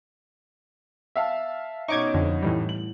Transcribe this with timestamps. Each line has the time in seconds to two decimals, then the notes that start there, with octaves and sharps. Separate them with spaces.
1.16 E5 F5 A5
1.88 B2 C#4 D#4 C#6 D6 G#6
2.14 F2 D3
2.42 A2 E3 G3
2.69 F#7